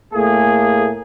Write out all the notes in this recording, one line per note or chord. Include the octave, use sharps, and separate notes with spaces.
A2 A3 A#3 G#4